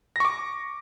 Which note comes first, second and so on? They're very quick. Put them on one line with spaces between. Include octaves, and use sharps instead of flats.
A#6 C#6 D6